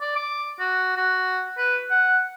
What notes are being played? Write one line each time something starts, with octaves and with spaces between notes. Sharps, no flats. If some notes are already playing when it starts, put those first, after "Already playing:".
D5
D6
F#4
F#4
B4
F#5